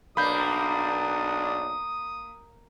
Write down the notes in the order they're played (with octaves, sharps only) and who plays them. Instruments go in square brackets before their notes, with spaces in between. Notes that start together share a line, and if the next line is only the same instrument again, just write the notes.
[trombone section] B1 D4 [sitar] A#3 [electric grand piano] B5 G6 [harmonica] D#6